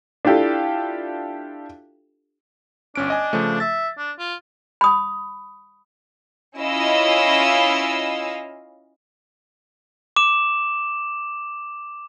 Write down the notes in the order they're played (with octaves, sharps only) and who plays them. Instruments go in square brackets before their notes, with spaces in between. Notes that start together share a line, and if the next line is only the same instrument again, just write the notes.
[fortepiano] D4 E4 F4 G4 A4
[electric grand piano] G1 C#4 D7 [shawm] D4
[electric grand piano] D#5 G#5
C#3 F3 A3
[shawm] E5 [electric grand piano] A6
[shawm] D4
F4
[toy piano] B5 D#6
[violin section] C#4 E4 F4 D#5 F5 E6
[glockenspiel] D6 E7